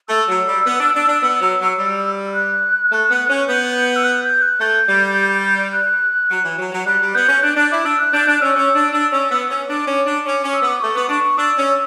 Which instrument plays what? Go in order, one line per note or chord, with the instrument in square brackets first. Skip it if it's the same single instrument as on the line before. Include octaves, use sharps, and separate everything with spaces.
[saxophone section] A3 [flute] E6
[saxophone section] F#3
G3
B3
D4
D4
D4
B3
F#3
F#3
G3
[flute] F#6
[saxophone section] A3
B3
C#4
[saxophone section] B3 [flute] G6
[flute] G6
E6
F#6
G6
F#6
[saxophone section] A3 [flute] G6
[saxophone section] G3
[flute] F#6
[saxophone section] F#3
E3
F#3
F#3
[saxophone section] G3 [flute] F#6
[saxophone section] G3
[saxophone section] B3 [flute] G6
[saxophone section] C#4
[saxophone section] D4 [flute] F#6
[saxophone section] D4 [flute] F#6
[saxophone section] E4 [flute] D6
[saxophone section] D4 [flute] E6
[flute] F#6
[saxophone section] D4 [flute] G6
[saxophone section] D4 [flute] F#6
[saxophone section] C#4 [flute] E6
[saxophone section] C#4
D4
D4
C#4
B3
C#4
[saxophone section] D4 [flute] D6
[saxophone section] C#4
D4
C#4
C#4
[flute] E6
[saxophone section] B3
[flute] D6
[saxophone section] A3 [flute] C#6
[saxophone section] B3
[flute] D6
[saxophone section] D4 [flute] C#6
[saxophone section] D4 [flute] E6
[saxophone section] C#4